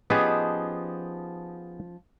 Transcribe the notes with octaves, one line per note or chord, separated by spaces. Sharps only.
F3 B3 C#4 D#4 G4 G#4